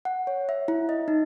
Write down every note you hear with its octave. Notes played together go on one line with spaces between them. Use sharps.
F#5
C#5
E5
E4
D#5
D#4